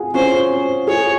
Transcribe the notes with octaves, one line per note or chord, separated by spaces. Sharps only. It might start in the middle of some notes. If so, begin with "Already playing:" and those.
Already playing: F4 F#4 G#4
C#4 F4 C5
F4 G#4 C#5